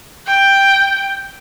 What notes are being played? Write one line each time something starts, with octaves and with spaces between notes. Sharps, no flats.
G5